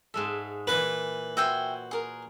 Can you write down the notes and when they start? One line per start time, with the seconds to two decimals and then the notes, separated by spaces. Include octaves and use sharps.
0.14 G#2 G#3 A4 E5
0.67 A#2 E3 B4
1.37 F#4 C5 E5 G5 G#5
1.91 G#4 A#4